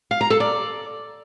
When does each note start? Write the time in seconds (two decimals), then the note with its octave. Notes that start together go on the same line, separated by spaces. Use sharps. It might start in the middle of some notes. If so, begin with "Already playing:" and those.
0.11 F5
0.21 A#5
0.30 A4
0.40 D5